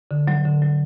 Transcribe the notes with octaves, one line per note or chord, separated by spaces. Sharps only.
D3
F#3
D3
F#3